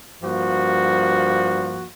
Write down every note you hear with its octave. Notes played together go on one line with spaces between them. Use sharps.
G2 F3 A#3 F#4